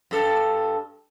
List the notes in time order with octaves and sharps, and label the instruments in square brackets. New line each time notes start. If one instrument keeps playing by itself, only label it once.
[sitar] G2 A4